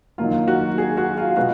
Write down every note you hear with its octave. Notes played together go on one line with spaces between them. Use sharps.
D#3 F#3 A#3 F4
F#4
G#4
F#4
F4
B2 G#3 B3 F#4